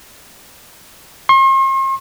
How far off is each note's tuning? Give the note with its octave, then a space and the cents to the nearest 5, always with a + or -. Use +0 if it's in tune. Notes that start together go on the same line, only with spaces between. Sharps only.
C6 +45